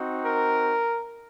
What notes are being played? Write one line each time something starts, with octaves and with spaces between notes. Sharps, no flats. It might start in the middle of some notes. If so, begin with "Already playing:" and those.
Already playing: C4 D#4 F#4
A#4